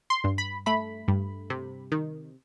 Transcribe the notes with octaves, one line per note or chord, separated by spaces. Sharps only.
C6
G2
B5
A3 B5
G2
C3
D#3